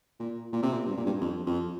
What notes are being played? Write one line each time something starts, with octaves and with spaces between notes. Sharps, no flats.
A#2
A#2
C3
A#2
G2
A#2
G2
F2
F2